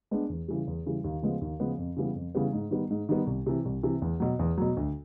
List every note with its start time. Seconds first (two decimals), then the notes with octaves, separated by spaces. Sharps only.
0.11 G#3 B3 D4
0.29 E2
0.48 C#3 E3 G3
0.67 E2
0.86 C#3 E3 G3
1.04 D#2
1.22 C#3 F3 G#3 B3
1.41 D#2
1.60 C#3 F3 G#3 B3
1.78 F2
1.97 C#3 E3 G3 B3
2.16 F2
2.35 C#3 E3 G3 B3
2.53 G#2
2.71 D#3 G3 B3
2.90 G#2
3.09 D#3 G3 B3
3.27 C2
3.46 C3 E3
3.65 C2
3.83 C3 E3
4.02 E2
4.20 B2 F#3
4.39 E2
4.58 B2 F#3
4.77 D2